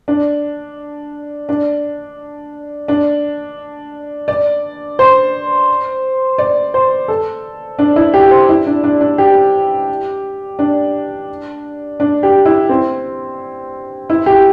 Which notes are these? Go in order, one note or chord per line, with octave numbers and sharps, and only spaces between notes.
D4
D4
D4
D5
C5
D5
C5
A4
D4
E4
G4
C5
E4
D4
D4
D4
G4
D4
D4
G4
E4
C4
E4
G4